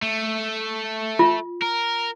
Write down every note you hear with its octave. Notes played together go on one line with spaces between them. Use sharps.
A3
F4
A#4